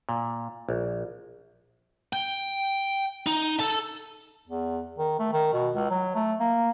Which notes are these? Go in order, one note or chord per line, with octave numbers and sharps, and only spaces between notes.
A#2
A#1
G5
D#4
A4 A5
E2
D#3
A3
D#3
B2
C#2
F#3
A3
A#3